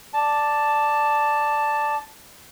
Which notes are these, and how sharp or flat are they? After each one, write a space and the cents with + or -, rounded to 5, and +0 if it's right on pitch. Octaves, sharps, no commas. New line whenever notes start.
D5 +0 A5 +0